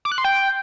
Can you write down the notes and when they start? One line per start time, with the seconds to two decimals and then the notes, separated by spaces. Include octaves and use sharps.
0.05 D6
0.12 F#6
0.18 C6
0.24 G5